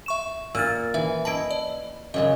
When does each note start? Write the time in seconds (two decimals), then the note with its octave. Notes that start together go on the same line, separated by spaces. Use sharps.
0.06 E5 C#6 E7
0.55 A#2 E6 F6 A6
0.94 E3 E5
1.25 E4 D#5 A5 B5 D7
1.51 D5
2.14 F#2 C#3 G#3 D#5